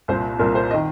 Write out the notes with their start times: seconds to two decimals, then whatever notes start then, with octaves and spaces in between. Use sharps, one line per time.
0.08 C2 A#2 C5
0.39 C2 A#2 A#4
0.55 C5
0.71 D#5
0.74 D#3